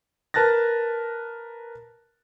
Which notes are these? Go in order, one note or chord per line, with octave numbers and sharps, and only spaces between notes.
A#4 B4 A5 F#6 A6 A#6